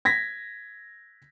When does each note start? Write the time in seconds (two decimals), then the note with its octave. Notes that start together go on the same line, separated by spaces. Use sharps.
0.05 G#6 A#6 B6